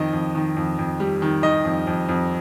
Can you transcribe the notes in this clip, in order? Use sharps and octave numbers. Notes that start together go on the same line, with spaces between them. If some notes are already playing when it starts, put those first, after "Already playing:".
Already playing: F2 D#3 D#5
F2
D#3
F2
F2
G3
D#3
D#3 D#5
F2
F2
F2